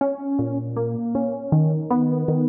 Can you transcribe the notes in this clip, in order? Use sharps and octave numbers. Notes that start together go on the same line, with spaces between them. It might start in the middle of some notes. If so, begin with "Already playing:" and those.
C#4
A#2
A#3
C#4
D#3
B3
D#3